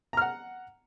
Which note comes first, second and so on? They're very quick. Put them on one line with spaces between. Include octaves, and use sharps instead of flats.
A#5 F6 F#5